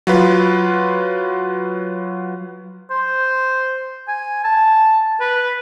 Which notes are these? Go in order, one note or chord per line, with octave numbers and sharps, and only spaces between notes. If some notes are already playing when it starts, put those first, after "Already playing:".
F#3 F4 B4
C5
G#5
A5
B4